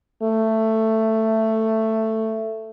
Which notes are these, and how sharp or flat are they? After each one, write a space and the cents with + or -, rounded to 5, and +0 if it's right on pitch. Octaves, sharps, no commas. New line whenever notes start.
A3 +10